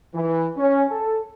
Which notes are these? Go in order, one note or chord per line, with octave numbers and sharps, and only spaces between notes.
E3
C#4
A4